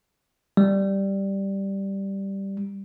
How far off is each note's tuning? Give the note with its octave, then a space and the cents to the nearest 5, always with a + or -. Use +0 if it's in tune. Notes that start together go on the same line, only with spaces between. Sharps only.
G3 +0